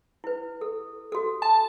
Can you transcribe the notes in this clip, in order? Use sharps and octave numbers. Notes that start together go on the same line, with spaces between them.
E4 B4
A4
F#4 A4
A5